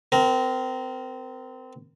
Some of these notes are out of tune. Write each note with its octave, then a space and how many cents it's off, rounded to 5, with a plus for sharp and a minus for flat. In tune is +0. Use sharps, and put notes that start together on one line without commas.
C4 -25 A#4 +0